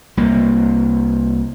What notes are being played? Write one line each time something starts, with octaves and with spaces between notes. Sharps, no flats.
C2 A#3